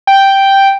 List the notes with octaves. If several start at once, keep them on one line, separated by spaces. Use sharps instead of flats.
G5